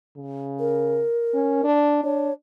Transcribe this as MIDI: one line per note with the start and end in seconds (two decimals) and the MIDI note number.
0.17 1.05 49
0.59 1.65 70
1.34 1.61 61
1.64 2.03 62
2.04 2.30 62
2.04 2.33 73